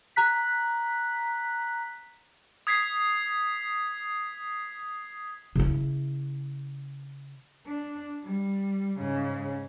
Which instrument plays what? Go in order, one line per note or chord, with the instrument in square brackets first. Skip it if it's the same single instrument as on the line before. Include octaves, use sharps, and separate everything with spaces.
[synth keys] A#5 F#6 B6
[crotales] D#6 G#6 B6 C7
[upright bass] C#3 E4
[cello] D4
G3
G#2 C#3